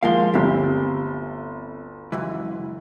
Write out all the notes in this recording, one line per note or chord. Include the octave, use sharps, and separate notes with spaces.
D#2 F3 G#3 A#4 F5 G7
G1 D2 C4 G4
C#2 F#2 E3